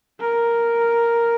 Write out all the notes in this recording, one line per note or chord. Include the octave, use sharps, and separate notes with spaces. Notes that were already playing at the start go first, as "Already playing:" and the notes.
A#4